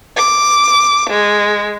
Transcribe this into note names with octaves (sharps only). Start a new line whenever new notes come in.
D6
G#3